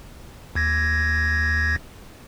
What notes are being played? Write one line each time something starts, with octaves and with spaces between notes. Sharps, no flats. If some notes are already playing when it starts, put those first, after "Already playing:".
D#2 G#6 A#6